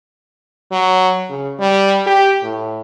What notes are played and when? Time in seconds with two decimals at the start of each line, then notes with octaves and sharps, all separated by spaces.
0.71 F#3
1.30 C#3
1.60 G3
2.06 G4
2.43 A2